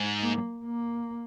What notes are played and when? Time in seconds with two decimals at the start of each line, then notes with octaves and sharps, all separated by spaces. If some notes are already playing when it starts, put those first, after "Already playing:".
Already playing: G#2
0.22 A#3
0.64 A#3